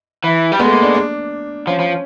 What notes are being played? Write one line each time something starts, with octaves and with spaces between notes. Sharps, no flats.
E3
G3
G#3 B3
A3
A#3
D4
D4
F3 C#4
F3